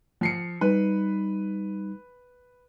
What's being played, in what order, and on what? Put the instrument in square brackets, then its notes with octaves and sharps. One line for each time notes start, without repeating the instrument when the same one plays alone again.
[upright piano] F3 C7 C#7
[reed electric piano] G3 D#4 [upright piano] B4